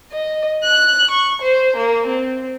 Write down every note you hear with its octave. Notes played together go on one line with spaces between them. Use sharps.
D#5
F#6
C#6
C5
A#3
C4